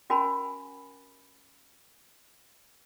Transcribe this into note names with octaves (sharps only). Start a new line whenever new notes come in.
C#4 F#4 A#4 G#5 B5